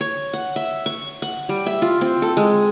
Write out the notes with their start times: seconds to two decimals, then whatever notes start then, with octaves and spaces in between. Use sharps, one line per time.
0.01 C#5
0.33 F#5
0.56 E5
0.86 C#6
1.22 F#5
1.49 G3
1.66 E5
1.82 F4
2.01 C4
2.22 A4
2.37 G#3